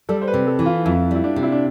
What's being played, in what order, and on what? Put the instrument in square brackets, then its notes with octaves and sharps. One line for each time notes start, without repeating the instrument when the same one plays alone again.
[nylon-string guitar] G3 [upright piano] A4
[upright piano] C5
B4
[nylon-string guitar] C3
[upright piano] A4
[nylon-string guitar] E3
[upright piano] F4
[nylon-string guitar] F2 [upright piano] E4
[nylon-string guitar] G3 [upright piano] E4
[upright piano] D4
[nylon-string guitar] C3
[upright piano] E4
D4